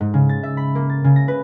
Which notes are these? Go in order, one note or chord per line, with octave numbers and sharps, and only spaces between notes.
G#2
C#3
A6
E5
B5
A#3
A6
C#3
A#6
B4